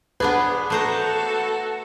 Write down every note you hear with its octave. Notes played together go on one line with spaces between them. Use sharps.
B3 D4 G#4 B4
A3 F#4 A4 C5 A#5